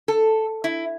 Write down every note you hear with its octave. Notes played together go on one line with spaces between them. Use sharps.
A4
E4